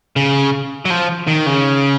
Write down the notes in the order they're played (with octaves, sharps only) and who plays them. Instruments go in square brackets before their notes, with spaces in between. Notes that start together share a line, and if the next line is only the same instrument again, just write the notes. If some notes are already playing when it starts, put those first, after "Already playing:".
[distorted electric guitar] C#3
F#3
F3
D#3
C#3